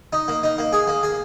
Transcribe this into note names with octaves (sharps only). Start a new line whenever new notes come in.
D#4
A#3
D#4
A#3
G#4
A#3
G#4